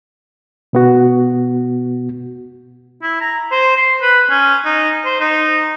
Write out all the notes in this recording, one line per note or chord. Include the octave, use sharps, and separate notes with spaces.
B2 B3 F#4
E4
A#5
C5
C6
B4
C#4
D#4
C5
D#4